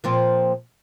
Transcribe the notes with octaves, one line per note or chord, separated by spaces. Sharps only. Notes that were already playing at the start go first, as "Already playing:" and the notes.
A#2 F3 C4